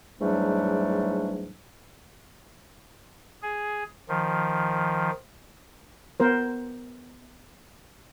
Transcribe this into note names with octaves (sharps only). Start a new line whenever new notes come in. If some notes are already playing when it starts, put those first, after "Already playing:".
E2 G#2 F#3 G3 A3 D4
G#4
D#3 F3
B3 A#4 C5